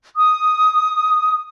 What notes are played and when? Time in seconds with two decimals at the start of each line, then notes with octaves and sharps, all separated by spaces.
0.15 D#6